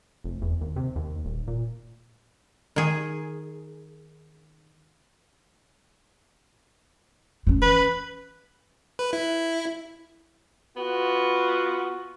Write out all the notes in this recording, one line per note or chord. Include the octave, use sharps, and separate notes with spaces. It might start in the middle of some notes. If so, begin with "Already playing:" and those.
F1
E2
D#2
C3
D#2
D#1
A#2
D#3 G#4
E3 C#4
B4
B4
E4
B3 F4 F#4